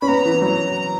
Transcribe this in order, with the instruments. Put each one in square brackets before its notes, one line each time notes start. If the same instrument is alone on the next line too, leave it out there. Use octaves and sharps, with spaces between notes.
[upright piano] C#4 [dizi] B5
[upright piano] B3 [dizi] A#5
[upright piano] E3
F#3